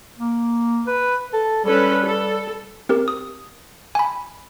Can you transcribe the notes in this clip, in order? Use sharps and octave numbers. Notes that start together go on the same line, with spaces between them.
A#3
B4
A4
G3 C#4 A4 B4
A4
C4 G4 A#4
D#6
G#5 B5